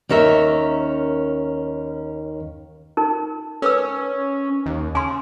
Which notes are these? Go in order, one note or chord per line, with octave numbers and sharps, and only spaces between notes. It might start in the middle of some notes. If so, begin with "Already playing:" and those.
D#2 C#4 A#4 E5
D#4 A#4
C#4 A#4 B4 E6
D#2
C#3 G#5 C6